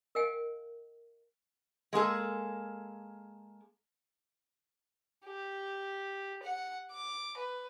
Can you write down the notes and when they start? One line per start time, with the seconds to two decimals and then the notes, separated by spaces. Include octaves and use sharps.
0.15 A#4 D#5 F5 G5 G#5
1.93 G#3 A#3 G#4 A4
5.26 G4
6.43 F#5
6.92 D6
7.37 B4